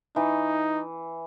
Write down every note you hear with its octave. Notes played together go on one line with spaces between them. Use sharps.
E3 D#4